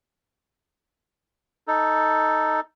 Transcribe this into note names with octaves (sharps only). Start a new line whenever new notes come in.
D#4 A4